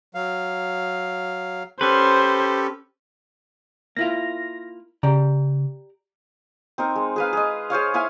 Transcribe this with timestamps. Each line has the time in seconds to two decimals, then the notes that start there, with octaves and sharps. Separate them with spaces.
0.15 F#3 F5
1.81 C#4 G4 A4 B4 C5
3.97 A#3 E4 F4 A#6
5.03 C#3 G4 D5 A#5
6.78 C4 D#4 A#4
6.96 G#3
7.16 G#4 B4 F5
7.33 G#4 D#5
7.70 G#4 C5 C#5 F5
7.94 E4 E5 F5 G#5